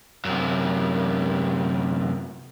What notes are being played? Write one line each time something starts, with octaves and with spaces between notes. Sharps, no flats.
F#2 C3